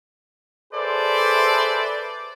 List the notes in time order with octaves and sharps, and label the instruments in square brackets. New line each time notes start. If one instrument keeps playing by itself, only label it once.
[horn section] G#4 A4 B4 C5 D5 E5